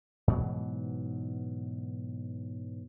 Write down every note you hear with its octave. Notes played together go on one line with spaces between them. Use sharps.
G#2 B2 E3 F#3